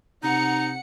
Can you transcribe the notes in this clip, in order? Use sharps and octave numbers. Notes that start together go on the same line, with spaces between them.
C3 D#4 F#5 A#5 C#7